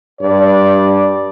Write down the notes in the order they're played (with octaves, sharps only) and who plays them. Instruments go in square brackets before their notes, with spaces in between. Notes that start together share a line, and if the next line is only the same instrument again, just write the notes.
[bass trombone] G2 [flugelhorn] D5